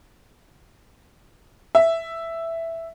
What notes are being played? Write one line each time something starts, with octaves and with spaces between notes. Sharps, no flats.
E5